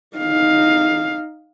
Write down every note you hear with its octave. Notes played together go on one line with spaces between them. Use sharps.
D#4 F5